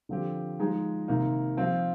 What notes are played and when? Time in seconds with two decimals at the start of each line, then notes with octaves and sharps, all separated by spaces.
0.09 D3 F3 C4 G4
0.59 F3 G#3 D#4 G#4
1.08 C3 D#3 A#3 D#4
1.57 F3 C4 F4